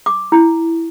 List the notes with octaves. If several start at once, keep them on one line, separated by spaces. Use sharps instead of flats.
D6
E4